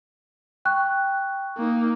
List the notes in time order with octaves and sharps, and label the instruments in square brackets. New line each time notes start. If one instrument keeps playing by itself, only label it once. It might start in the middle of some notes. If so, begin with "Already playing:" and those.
[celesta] G5 C#6 F#6
[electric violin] A#3 D#4